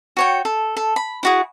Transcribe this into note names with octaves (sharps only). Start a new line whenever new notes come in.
F#4 C#5 G5
A4
A4
B5
E4 F#4 G#4